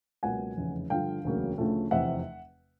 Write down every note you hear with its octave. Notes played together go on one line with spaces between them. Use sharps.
C#2 B2 F#3 A#3 F#5 G#5
F1 E2 C#3 E3
G2 D3 F3 F5 G5
E1 D2 C#3 F#3 A#3
D2 C#3 F3 A3
F1 E2 C3 E5 F#5